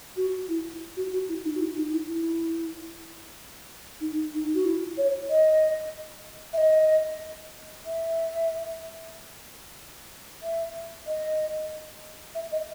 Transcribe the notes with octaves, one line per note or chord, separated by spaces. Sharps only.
F#4
E4
F#4
F#4
E4
D#4
F#4
E4
D#4
E4
E4
D#4
D#4
F#4
E4
C#5
D#5
E5
D#5
E5
E5
D#5
E5
D#5